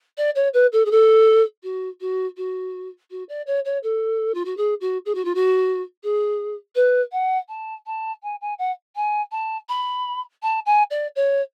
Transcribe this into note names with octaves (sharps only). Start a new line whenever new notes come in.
D5
C#5
B4
A4
G#4
A4
F#4
F#4
F#4
F#4
D5
C#5
C#5
A4
F4
F#4
G#4
F#4
G#4
F#4
F4
F#4
G#4
B4
F#5
A5
A5
G#5
G#5
F#5
G#5
A5
B5
A5
G#5
D5
C#5